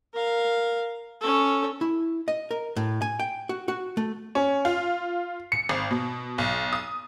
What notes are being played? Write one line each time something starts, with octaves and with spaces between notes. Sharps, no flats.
A#4 F5
C#4 A4
E4
D#5
A#4
A2
G#5
G5
F#4
F#4
A3
C#4
F4
C#7
G#1
B2
B1
D#6